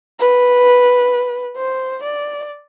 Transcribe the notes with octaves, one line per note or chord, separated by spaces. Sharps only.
B4
C5
D5